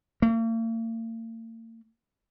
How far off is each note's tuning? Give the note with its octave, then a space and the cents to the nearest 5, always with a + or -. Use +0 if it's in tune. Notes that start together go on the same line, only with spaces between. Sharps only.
A#3 -45